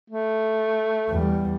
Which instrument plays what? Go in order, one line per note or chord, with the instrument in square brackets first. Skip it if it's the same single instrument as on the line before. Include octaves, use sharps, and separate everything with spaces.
[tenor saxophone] A3
[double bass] E2 G3